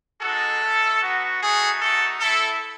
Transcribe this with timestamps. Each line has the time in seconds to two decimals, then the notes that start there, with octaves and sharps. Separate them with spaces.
0.21 G#3 D#4 F#4 A4
0.61 A3 C#4 E4
1.02 B3 D#4 F#4
1.41 A3 D#4 F#4 G#4
1.81 A3 D#4 F#4 A4
2.20 A3 E4 A4